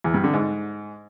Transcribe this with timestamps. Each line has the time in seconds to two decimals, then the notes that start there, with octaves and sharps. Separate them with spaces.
0.04 E2
0.14 G2
0.24 D3
0.33 G#2